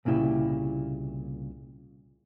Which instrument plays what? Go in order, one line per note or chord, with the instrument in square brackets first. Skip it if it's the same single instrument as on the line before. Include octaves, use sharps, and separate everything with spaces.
[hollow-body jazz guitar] C2 A#2 C#3 E4 G4